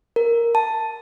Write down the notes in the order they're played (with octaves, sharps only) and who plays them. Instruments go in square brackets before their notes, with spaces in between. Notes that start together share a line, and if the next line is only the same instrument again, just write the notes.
[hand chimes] A#4
A5